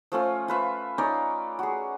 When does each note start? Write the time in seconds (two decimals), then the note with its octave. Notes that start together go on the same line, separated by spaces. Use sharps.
0.12 F3 A3 C#4 F4
0.48 F4 B4 E5
0.98 C#4 D#4 C#5 D5
1.59 F#4 G#4